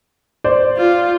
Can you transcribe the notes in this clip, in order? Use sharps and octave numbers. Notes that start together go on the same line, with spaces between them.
C5 D5
F4